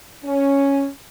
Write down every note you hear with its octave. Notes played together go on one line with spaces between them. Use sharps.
C#4